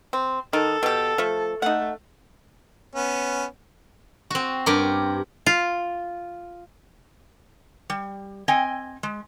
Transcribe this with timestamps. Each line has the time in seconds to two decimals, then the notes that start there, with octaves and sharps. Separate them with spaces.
0.13 C4
0.53 D#3 D#4 A4
0.83 B2 G4
1.18 F3 A3
1.62 A3 D#4 F#5
2.95 B3 C#4
4.30 C4 F#4
4.66 G2 G4 A#4
5.46 F4
7.90 G3
8.48 C4 D#5 G5 G#5
9.03 G#3